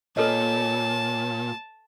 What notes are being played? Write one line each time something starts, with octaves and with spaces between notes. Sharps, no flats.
A#2 A4 B4 C#5 D#5 A5